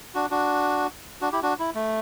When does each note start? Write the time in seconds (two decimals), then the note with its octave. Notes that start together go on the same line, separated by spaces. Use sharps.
0.14 D4 F#4
0.31 D4 F#4
1.21 D4 F#4
1.32 E4 G4
1.42 D4 F#4
1.59 E4
1.75 A3